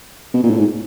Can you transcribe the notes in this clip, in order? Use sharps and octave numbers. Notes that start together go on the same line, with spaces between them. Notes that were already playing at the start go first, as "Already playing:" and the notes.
B2
A#2
A2
G#2